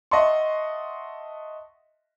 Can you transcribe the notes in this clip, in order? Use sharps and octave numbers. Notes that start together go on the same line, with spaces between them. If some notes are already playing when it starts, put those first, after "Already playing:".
D#5 E5 F#5 A5 C6 C#6